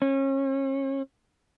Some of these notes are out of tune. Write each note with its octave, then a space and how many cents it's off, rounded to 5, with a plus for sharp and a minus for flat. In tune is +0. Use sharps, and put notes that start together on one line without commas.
C#4 -35